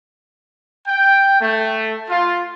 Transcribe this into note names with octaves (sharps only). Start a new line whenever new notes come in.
G5
A3
F4